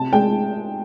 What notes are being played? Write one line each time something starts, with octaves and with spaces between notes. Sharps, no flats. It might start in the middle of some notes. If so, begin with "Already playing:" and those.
Already playing: C3 A5
G#3 G5